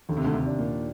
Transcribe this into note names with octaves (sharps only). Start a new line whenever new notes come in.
D#2 D3
C3
D2 D3
C3
D4
A#2